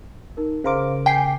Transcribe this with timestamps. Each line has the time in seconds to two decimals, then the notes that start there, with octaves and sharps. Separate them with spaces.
0.37 D#4 A#4
0.64 C#3 A#4 C5 F5 C6 D6
1.06 G5 G#5 B6 C7